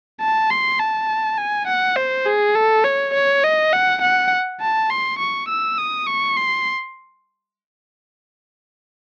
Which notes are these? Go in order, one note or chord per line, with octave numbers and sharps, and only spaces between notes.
A5
C6
A5
G#5
F#5
C5
G#4
A4
C#5
C#5
D#5
F#5
F#5
A5
C6
C#6
E6
D#6
C#6
C6